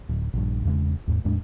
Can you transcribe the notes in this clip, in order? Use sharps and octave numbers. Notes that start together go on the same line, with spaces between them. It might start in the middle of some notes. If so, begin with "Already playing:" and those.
D1
A#1 G2
E2 C#3 G#3
D#2 G#2
E2 A2 G#3 D4